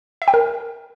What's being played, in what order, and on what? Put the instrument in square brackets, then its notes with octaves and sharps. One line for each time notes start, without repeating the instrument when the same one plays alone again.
[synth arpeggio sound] E5
G5
A#4